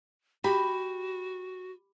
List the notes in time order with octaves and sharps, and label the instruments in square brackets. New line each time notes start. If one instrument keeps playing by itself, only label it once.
[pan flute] F#4 [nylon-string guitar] G4 [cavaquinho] B5